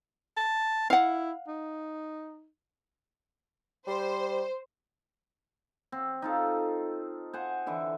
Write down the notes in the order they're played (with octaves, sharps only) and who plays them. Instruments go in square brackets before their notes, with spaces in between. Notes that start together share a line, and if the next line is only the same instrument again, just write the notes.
[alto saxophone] A5
[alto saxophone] E4 [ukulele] F5 F#5
[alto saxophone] D#4
[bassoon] G3 [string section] C5
[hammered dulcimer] C4
D#4 F4 A4
C5 F#5 G#5
D3 E3 E5